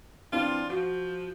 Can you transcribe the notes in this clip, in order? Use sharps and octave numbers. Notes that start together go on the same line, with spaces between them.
E3 C4 D4 F4
F3 F#4